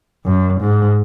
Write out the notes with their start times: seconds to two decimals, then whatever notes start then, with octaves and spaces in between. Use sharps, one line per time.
0.25 F#2
0.61 G#2